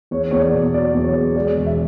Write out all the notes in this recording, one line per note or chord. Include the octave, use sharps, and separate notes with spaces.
E2 C#5
E2 C#5
D5
B2
F#3 D5
E2
C#5
E2
G#3 D5
E1
E5